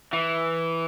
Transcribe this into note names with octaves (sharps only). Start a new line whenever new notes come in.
E3